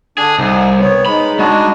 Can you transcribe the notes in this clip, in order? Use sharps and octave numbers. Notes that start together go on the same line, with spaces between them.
D3 D4 G#4
C2 D#4
B3 C#5
G#3 D#4 B5
G#3 D4 F#4